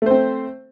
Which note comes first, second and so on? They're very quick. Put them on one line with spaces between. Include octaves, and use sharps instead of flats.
A3 C5 C4